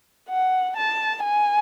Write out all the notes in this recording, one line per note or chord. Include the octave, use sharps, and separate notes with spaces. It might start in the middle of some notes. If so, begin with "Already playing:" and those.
F#5
A5
G#5